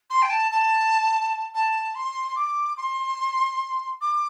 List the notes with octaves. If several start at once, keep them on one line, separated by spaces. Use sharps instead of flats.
C6
G5
A5
A5
A5
C6
D6
C6
D6